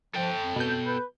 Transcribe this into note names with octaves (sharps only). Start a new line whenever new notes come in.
F3 A4 G5
F2
B2 G6
B4